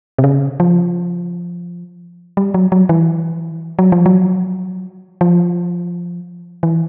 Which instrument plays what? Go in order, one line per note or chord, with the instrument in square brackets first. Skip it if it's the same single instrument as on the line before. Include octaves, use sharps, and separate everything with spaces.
[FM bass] C3
C#3
F3
G3
F#3
F#3
E3
F#3
F3
F#3
F3
E3